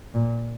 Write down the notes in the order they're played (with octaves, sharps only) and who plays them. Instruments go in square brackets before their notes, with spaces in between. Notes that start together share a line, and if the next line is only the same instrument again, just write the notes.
[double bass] A#2